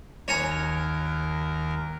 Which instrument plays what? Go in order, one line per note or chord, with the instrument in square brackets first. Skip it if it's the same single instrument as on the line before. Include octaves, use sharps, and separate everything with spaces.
[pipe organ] D#2 A#4 [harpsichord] C#5 G#5 A#5